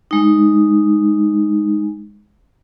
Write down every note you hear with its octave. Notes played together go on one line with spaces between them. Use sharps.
G#3 D#4